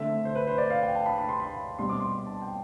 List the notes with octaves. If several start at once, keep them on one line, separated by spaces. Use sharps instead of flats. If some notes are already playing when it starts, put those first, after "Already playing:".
Already playing: D3 A3 C4 E5
C5
B4
C5
D5
F5
G5
A5
B5
B5
C6
B5
B2 G3 C4 C6
D6
C6
A5
G5